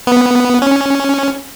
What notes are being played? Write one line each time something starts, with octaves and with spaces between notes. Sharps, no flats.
B3
C#4